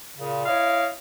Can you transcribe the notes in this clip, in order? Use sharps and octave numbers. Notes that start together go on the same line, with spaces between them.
A#2 C#3
E4 C#5 D#5 F5